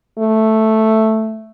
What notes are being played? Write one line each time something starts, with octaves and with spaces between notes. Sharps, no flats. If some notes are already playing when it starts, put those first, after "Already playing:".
A3